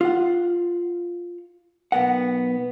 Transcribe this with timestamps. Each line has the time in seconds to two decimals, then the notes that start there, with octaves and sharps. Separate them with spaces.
0.01 F4 F#5
1.92 B1 B3 A#4 F#5